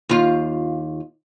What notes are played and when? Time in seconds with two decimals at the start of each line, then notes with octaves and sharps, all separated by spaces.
0.09 D#2 F4